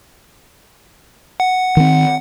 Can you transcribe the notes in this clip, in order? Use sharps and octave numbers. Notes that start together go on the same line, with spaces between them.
F#5
D#3 C4